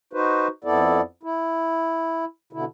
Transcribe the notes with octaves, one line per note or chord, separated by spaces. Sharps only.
D#4 F#4 B4 C5
F2 B3 E4 A4 D5
E4
B2 D3 E4